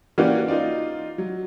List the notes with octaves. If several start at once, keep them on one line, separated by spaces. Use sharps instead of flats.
E3 A#3 C#4 F#4 G4 D5
D#4 F4 D5
F#3